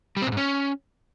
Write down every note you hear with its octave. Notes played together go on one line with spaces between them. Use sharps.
G3
C4
A#2
G#2
C#4